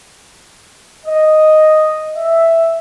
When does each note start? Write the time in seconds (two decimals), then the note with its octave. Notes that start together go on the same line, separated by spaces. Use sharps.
1.06 D#5
2.16 E5